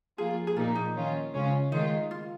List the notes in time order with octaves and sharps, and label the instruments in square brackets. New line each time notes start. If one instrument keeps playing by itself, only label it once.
[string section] F3 A#3 F4 [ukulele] G#4
[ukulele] G#4
[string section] A#2 F3 A#3 D#4 [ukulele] F4
[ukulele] D#4
[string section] D#3 C#4 F4
C#3 G#3 C#4 F4
[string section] D#3 G#3 F4 [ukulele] D#4
[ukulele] F4